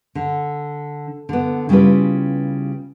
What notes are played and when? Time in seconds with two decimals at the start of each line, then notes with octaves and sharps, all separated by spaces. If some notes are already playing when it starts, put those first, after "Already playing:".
0.15 D3
1.29 D3 B3
1.69 C#3 G3 E4 F4 B4